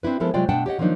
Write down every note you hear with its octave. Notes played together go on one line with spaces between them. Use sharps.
C4 D4 E4 B4
F3 G#3 B3 E4 A4 A#4
C3 F#3 G#3 F4 D5 G5
B2 A3 D4 F#5 G5 A5
G4 C#5 D#5 F#5
D#3 F3 F#3 A#3 D4 D#4